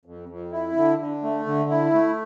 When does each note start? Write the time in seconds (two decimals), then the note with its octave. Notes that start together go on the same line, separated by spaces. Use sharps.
0.05 F2
0.29 F2
0.52 E4
0.76 D3
0.99 D3
1.23 A3
1.46 D3
1.70 E4
1.94 A3